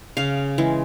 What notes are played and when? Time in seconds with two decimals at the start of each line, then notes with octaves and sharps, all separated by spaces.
0.17 C#3 F5
0.58 E3 G#3